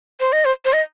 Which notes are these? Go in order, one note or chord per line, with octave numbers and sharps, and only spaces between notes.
C5
D#5
C5
C5
D#5